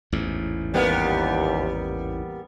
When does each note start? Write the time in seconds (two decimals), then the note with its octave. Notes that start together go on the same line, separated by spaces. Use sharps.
0.12 A1 E2 G#2
0.74 D#2 G3 A#3 B3